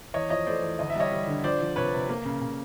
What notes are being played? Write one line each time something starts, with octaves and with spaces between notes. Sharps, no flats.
E2 C#5 D#5
F3 C#5 D#5
A3 C5 D5
E2
D2 D#5
E5
G3 C#5 D#5
G3
D3
F3 C5 D5
F3
C3 B4 C#5
C3
A#3
C#3
C#3